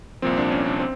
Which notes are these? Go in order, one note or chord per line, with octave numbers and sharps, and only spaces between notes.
C2 A#2 F3 C4
D4
C#4
D4
C4